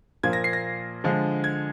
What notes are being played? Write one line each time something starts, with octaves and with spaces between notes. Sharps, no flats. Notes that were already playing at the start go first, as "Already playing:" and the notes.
A#2 F3 A#3 G#6
A#6
C7
A#6
D3 F3 G#3
G#6